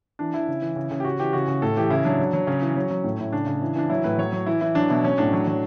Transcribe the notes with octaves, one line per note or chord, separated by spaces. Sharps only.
E3 D4
E3 E4
C#3
E3
C#3
C#3
G4
C#3 F#4
E3 G4
C#3 F#4
C#3
A2 A4
E3 G4
C#3 E4
F#3 D4
F#3
F#3
C#3 C#4
E3
F#3
F#3
A2
A2 E4
C#3 D4
C#3
E3
E3 D4
F#3 E4
A2 B4
F#3 C#5
F#3
E3 E4
E3 E4
F#3 D4
B2 E4
F#3 C#4
A2 D4
F#3
F#3